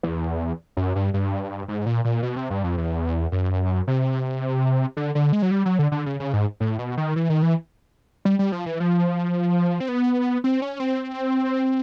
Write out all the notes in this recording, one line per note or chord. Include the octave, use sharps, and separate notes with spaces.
E2
F#2
G2
G2
G#2
A#2
A#2
B2
C3
G2
F2
E2
F#2
C3
D3
D3
G#3
F#3
G3
F#3
D3
D3
C#3
C#3
G#2
A2
B2
D#3
E3
D#3
E3
G3
G3
F3
E3
F3
C4
B3
C4
C#4
C4